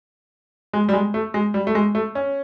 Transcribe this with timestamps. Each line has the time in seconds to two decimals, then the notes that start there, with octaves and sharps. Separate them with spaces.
0.73 G#3
0.89 G3
0.93 G#3
1.14 A3
1.34 G#3
1.54 G3
1.67 A3
1.75 G#3
1.95 A3
2.15 C#4